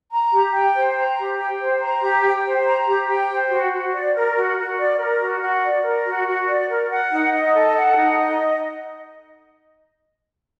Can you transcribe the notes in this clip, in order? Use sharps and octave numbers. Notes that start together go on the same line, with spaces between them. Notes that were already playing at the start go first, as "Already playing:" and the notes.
A#5
G4
G5
C5
A#5
G4
G5
C5
A#5
G4
G5
C5
A#5
G4
G5
C5
F#4
F#4
D5
A#4
F#4
F#4
D5
A#4
F#4
F#4
D5
A#4
F#4
F#4
D5
A#4
F#5
D#4
D#5
A4
F#5
D#4
D#5